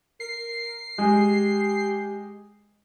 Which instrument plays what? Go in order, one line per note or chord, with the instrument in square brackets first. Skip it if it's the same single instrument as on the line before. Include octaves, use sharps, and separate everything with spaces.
[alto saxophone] A#4 [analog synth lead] C7
[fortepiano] G#3 [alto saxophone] G4